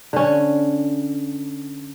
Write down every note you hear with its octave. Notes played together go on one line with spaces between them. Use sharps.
D3 C#4